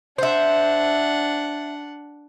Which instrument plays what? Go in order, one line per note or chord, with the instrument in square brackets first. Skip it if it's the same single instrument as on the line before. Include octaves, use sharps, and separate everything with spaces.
[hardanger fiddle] D4 F#5 [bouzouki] C5 E5